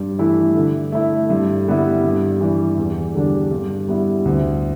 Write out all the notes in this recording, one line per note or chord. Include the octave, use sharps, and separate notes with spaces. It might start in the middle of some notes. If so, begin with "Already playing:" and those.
Already playing: G2
E3 A3 E4
D3
A3 E4
G2
D3 G3 B3 E4
G2
E3 G3
E2
D3 G3 D4
G2
G3 B3 E4
D2